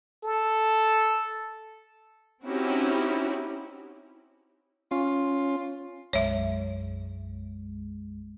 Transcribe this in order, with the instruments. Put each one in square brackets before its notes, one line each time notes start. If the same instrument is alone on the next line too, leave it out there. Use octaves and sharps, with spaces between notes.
[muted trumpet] A4
[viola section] C4 C#4 D#4 E4 F#4 G4
[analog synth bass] C#4 [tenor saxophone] F4
[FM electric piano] B1 F#2 G#3 [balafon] C#5 E5